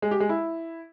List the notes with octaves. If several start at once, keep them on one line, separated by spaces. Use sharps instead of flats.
G#3
G4
G#3
E4